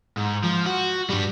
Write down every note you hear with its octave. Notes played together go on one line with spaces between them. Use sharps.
G#2
F3
F#4
G2 G3